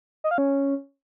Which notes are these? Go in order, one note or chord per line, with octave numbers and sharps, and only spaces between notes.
D#5
F5
C#4